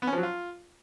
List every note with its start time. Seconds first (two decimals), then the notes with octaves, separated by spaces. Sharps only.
0.02 B3
0.07 C#4
0.13 F3
0.18 F#3
0.23 F4